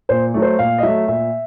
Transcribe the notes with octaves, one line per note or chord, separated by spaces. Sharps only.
A#2 C5
F#3 A3
C5
A#2 F5
D#5
F#3 A3 E5
A#2 E5